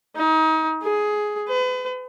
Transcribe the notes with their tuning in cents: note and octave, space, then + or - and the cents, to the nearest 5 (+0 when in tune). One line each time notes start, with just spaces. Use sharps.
D#4 +30
G#4 +10
B4 +40